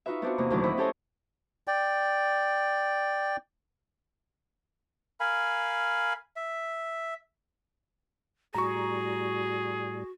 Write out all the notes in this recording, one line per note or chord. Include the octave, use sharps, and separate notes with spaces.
D#4 F4 F#4 B4 E5
B3 C4 D4 F4 F#4
E2 C3 A#3 D#5
D2 A#2 D#3 E3 F#3 D4
C4 E4 D#5 E5 F#5 B5
C#4 G4 A4 C5 C#5 D#5
D5 G5
A#4 F5 G#5 B5
E5
A2 G3 F#4 G#4 A#5 C#6